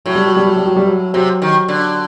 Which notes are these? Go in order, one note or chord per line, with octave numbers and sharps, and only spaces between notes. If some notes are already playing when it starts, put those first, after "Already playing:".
A2 F#3
G3
F#3
G3
F#3
G3
F#3
G3
F#3
C3 F#3
D#3
D3